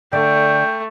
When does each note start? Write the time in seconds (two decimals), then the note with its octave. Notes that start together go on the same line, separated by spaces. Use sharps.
0.13 D3 A3 D5 G5